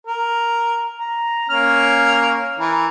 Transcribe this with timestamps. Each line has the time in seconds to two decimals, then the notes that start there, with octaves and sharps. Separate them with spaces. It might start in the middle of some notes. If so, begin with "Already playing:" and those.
0.07 A#4
0.98 A#5
1.49 A#3 C#4 F6
2.59 E3 A#4